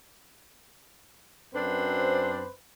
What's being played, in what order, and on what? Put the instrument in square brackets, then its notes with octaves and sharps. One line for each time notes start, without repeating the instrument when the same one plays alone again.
[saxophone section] F#2 C4 D4 B4 C5